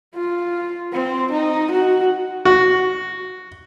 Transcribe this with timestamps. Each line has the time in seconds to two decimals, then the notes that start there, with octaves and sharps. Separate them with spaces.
0.14 F4
0.92 C4
1.31 D#4
1.71 F#4
2.45 F#4